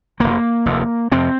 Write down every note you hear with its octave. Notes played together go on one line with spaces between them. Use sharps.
F1 D#2 A#3
F1 D#2
F2 C3 C4